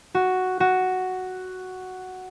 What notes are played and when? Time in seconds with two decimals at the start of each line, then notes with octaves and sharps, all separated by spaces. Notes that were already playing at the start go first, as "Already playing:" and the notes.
0.15 F#4
0.60 F#4